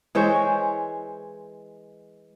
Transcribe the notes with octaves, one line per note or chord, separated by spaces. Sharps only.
E3 G#3 C5 C#5